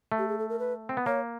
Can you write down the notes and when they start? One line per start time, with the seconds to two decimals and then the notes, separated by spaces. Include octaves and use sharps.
0.12 A3
0.18 G4
0.28 G#4
0.39 A4
0.49 A#4
0.59 B4
0.89 C4
0.97 B3
1.06 A#3 C#5